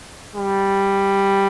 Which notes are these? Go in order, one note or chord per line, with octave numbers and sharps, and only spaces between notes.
G3